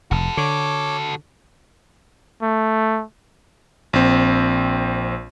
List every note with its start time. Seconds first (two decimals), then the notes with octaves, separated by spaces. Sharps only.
0.11 F1 F#4 A4
0.37 D3 C#5 D6
2.42 A3
3.93 A#1 C4